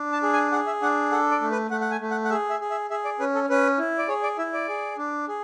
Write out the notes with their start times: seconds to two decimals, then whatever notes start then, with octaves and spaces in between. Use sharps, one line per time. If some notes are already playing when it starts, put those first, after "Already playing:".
Already playing: D4
0.12 A5
0.23 G#4
0.33 G#5
0.52 G#4 F#5
0.67 E5
0.82 D4 F#5
1.12 A4 F#5
1.31 D5
1.41 A3
1.51 B4
1.70 A3 F#5
1.81 F#5
1.91 G#5
2.01 A3
2.11 F#5
2.25 F#5
2.30 G#4 E5
2.50 E5
2.61 G#4
2.70 E5
2.90 G#4 E5
3.05 D5
3.20 C#4 B4
3.35 A4
3.50 C#4 B4
3.78 E4
3.98 D5
4.08 G#4 C#5
4.23 D5
4.38 E4 E5
4.53 D5
4.68 G#4
4.98 D4
5.28 G#4